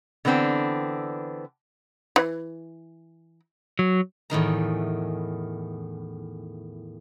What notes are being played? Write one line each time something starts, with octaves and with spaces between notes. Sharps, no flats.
D3 E3 B3 C4 D4
E3
F#3
E2 A2 D#3 A#5